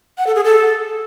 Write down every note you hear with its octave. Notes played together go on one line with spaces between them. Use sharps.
F#5
A4
G#4
A4